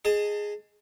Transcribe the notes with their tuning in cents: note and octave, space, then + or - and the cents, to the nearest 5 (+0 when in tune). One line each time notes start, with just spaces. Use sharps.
G#4 +0 D#5 +0 A5 +30